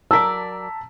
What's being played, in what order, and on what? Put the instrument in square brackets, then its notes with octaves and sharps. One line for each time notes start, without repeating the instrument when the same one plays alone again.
[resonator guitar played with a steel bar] F#3 A#4 D5 [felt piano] A5 A#5 B6 [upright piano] E6